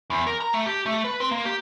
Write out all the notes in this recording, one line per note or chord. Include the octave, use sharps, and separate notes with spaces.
E2
A#4
A#5
A3
G4
A3
B4
C4
A#3
G4